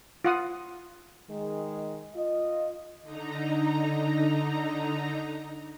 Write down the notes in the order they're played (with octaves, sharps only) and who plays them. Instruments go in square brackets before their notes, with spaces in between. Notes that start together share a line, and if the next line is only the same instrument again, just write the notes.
[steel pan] F4 F#5 D#6
[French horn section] D#3 G#3
F4 D#5
[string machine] D3 D#4 A#5